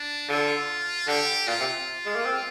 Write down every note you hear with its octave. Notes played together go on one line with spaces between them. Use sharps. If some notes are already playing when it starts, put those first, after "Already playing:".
Already playing: D4
D3 F4
D3 G4
A#2 F4
C3
G#3
A#3
C4